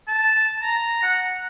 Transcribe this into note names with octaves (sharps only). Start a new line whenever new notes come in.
A5
A#5
F#5